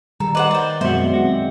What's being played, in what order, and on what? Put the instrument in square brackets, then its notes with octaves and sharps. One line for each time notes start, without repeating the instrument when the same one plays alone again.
[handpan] D#3 G3 [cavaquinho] A4 [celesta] A#5
[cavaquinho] B4 C5 F#5 [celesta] D#5 D6 F#7
[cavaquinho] C5 D5
[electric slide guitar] F#2 B2 F#4 [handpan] G#3 C4 [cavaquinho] C5 [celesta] E5 B6
[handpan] G#3 C4 [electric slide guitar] F#4